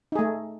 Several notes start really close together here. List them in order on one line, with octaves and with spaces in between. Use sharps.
D#4 G#4 A3